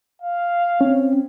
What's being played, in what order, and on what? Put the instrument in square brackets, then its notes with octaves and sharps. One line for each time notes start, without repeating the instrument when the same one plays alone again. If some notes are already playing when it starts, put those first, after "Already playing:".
[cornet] F5
[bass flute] C4 [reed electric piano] C#4